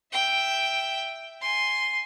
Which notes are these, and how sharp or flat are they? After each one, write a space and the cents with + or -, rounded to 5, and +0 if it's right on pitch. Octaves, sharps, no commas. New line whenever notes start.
E5 +0 G5 +0
G#5 +0 C6 +0